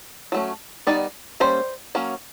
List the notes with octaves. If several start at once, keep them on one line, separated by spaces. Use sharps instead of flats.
F#3 A3 C#4
D#3 G3 B3 D#4 D5
G3 A#3 C#4 C5
F#3 A#3 C#4